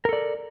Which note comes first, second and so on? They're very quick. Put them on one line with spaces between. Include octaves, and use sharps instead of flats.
A#4 A4 D5